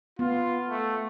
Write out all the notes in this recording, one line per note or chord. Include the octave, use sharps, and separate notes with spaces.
B3 F4
A3